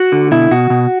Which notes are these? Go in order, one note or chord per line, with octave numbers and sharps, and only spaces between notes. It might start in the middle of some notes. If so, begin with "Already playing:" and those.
Already playing: F#4
D3
B2 E4
B2 F#4
B2